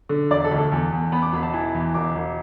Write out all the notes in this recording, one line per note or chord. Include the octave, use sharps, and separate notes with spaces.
D3
E1 D5
A4
D2
A4
E2
E2
B3 B5
D6
E1 B5
A5
E3
E2
E1 D6
E1